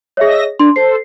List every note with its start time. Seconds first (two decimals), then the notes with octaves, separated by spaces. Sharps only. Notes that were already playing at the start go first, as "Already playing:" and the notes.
0.17 G#4 C#5 D#5 E5 A#6
0.60 D4 C6
0.76 A4 C5 C7